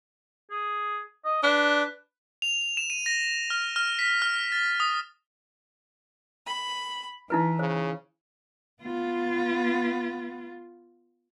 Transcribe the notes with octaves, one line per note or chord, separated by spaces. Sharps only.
G#4
D#5
D4 B4
F7
F7
E7
D#7
A#6
F6
F6
B6
F6
A6
D#6
B5
E3 D#4 E4 B4
C#3 C5
B3 F4